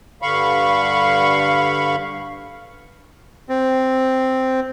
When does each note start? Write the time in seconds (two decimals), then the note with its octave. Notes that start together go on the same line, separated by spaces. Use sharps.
0.22 G2 D3 F5 B5 C#6
3.49 C4